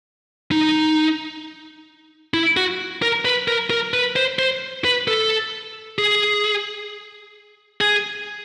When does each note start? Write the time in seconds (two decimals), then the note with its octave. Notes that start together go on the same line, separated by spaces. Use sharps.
0.52 D#4
2.34 E4
2.57 F#4
3.02 A#4
3.25 B4
3.48 A#4
3.70 A#4
3.94 B4
4.16 C5
4.39 C5
4.85 B4
5.08 A4
5.99 G#4
7.81 G#4